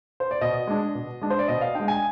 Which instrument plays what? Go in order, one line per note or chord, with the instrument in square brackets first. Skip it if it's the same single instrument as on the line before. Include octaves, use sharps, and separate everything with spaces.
[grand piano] C5
D5
B2 D#5
G#3 D4
B2
G#3 D4
C5
D5
B2 D#5
F5
G#3 D4 G5
G#5